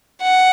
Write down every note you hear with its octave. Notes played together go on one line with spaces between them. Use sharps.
F#5